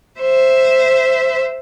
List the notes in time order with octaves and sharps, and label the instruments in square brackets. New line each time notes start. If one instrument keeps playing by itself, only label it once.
[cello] C5 E5